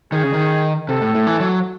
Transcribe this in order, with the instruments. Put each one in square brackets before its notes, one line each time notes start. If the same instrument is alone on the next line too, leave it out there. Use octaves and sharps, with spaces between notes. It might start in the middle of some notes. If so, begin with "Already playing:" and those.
[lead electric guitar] D#3 [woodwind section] G#4
[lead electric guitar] C#3
D#3
[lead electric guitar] C3 [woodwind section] A4
[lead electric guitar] A2
A2
E3
F#3